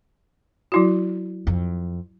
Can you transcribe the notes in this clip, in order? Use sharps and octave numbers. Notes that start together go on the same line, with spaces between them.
F#3 E4 F#4
F2